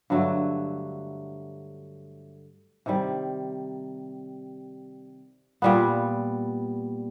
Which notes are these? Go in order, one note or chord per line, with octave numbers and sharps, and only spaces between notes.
G2 D3 F#3 A3
C3 D#3 G3
A#2 G3 B3